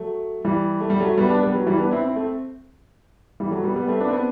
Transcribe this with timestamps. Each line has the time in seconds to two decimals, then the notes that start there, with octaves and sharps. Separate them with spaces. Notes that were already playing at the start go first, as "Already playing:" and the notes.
Already playing: F#3 A3
0.45 E3 G3
0.80 A3
0.90 G3
1.00 F#3 A3
1.17 G3 B3
1.30 B3 D4
1.43 G3 B3
1.55 F#3
1.66 E3 G3
1.79 B3 D4
1.91 C4 E4
2.05 C4 E4
2.16 A3 C4
3.40 E3 G3
3.51 F#3 A3
3.64 G3 B3
3.76 G3 B3
3.88 A3 C4
4.00 B3 D4
4.08 C4
4.13 B3 D4